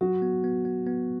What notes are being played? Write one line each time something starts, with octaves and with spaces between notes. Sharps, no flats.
F#3 F#4
B3
B3
B3
B3